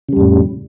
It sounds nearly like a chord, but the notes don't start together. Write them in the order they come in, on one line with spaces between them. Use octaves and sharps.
C#3 G3 F2 A2